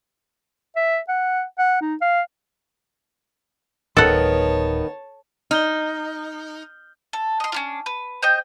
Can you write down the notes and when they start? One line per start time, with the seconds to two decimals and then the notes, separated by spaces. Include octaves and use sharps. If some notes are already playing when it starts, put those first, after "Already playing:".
0.76 E5
1.08 F#5
1.59 F#5
1.81 D#4
2.01 F5
3.97 D1 D#3 B3 A4 C#5 F#5 A5
5.51 D#4 F6 G6 G7
7.13 A4
7.40 D#5 C6
7.52 C#4 D4 F4
7.86 B4
8.22 C5 D#5 G5